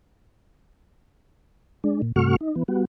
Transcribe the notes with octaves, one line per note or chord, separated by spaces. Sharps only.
G#3 D4
A#2
G2 C3 A3 F#4 C#6 F6
D#4
E3 B3
G3 B3 F#4